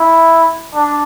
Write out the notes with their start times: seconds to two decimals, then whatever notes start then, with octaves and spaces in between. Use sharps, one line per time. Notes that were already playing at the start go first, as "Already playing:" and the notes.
Already playing: E4
0.75 D4